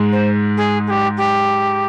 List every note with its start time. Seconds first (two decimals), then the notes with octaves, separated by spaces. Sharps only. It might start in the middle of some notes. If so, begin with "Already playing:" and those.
Already playing: G#2 G#3
0.12 C5
0.57 G#4
0.87 G#4
0.90 G4
1.17 G4